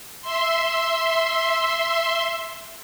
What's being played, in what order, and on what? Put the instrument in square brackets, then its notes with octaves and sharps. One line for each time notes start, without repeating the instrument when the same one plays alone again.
[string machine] E5 C6